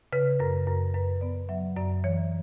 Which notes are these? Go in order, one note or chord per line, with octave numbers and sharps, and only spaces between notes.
C#3 B4
F#2 A#4
F#2 A#4
F#2 B4
B3 D5
F#3 E5
F#2 D5
E3 C#5